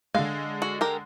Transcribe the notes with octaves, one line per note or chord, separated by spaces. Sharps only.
D3 G#3 F5
F#4
G4 A#4